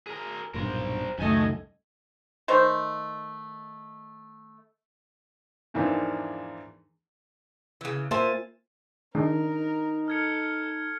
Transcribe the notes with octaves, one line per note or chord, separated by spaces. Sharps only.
G#4 A#4
B1 G2 A#2 A#4 C5
C#2 F#2 D#3 A3 A4 D#5 G#5
D#3 A3 C5
E2 G#2 E3 F3 A#3 D4
C#3 E3
A#3 F4 C5 E5 G#5 A5
D#3 G#3 D4 D#4 A#4
A4 F6 G#6 C#7